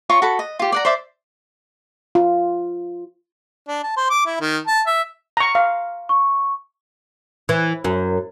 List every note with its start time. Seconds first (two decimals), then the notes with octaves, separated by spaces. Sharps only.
0.09 F4 C#5 A#5 C#6
0.22 F#4 A4 B5
0.39 D#5
0.59 F4 G4
0.72 D5 F#5 A#5
0.85 C5 D5 E5 D6
2.15 F4
3.68 D4
3.83 A5
3.97 C5
4.10 D6
4.26 E4
4.40 D#3
4.67 A5
4.86 E5
5.37 A#5 C#6
5.55 F5
6.09 C#6
7.49 E3
7.84 F#2